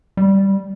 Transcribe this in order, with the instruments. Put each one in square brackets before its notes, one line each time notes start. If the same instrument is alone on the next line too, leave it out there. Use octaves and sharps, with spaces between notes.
[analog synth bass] G3